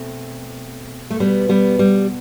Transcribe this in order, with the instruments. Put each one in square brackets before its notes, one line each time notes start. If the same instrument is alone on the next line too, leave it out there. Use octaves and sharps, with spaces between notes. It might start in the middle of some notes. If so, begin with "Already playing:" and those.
Already playing: [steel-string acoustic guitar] B2 A3 C4
A3
B2 G3 B3
G3 B3
G3